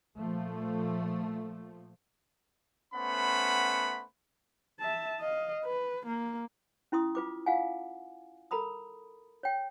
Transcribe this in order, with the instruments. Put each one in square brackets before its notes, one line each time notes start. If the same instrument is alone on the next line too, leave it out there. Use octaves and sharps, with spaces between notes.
[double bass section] A#2 F3 A3
[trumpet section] A3 B3 C#4 C5 F#5 B5
[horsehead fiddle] E5 A5
D#5 F5
B4
A#3
[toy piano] C#4 E4 C6 D#6
F4 B4 D6
F4 F5 F#5 G#5
A4 A#4 A#5 B5 D#6
C#5 G5